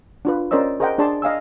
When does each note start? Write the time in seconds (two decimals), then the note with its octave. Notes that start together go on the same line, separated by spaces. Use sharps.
0.25 D4 F4 B4
0.51 C#4 A#4 C5 D5 D#5 E6
0.80 G#4 A#4 C5 D#5 F#5 G5
0.98 D4 G#4 D5 A5 C6
1.22 D#5 F5 G#5 E6